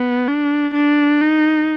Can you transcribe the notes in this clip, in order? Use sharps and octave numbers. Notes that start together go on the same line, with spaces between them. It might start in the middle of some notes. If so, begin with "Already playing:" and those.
Already playing: B3
D4
D4
D#4